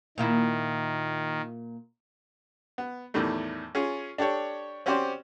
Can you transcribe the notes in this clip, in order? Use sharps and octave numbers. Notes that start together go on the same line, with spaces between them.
A#2 D#3 A#3 E4
B3
E2 A2 D#3 G3 A3
C#4 F4 G#4
D4 G4 A4 C#5
C4 C#4 F#4 G4 C5 D5